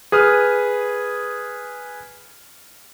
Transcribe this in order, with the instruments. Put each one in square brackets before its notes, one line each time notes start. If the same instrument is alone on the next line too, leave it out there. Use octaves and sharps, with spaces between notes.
[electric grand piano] G#4 B4 D#6 F6